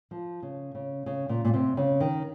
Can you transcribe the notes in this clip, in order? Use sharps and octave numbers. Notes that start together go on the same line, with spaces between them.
F3
C#3
C#3
C#3
A#2
A#2
C3
C#3
D#3